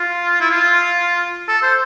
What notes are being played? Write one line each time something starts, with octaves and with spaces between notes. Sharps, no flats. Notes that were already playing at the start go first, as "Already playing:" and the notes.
Already playing: F4
E4
F4
A4
C5